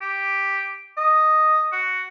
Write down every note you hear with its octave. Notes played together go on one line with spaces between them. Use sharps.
G4
D#5
F#4